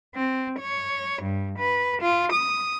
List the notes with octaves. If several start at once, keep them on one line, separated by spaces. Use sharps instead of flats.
C4
C#5
G2
B4
F4
D#6